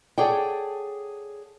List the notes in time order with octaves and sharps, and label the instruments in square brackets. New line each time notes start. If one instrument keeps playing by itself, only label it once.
[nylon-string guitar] G#4 A4 C#5 D5 F#5 G5